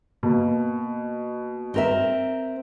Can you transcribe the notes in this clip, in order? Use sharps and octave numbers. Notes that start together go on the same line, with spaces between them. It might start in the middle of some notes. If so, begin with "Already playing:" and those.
B2 A#3
C4 A#4 E5